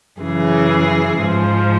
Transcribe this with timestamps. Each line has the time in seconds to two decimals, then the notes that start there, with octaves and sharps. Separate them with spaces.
0.20 F#2 C#3 E3 G#4
1.19 G#2 F3